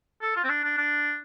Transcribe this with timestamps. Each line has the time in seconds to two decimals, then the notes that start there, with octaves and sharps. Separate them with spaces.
0.22 A4
0.36 F4
0.44 C4
0.49 D4
0.64 D4
0.78 D4